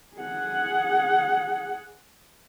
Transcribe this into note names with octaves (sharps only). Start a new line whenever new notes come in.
G#4 F#5